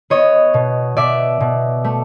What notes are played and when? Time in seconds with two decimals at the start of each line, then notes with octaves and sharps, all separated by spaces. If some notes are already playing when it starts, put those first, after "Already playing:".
0.10 B3 C#5 D#5
0.54 B2
0.97 B2 D5 E5
1.40 B2
1.84 A3